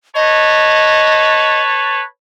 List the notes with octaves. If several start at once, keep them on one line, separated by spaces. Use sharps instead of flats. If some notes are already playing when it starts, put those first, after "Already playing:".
B4 C#5 D#5 A5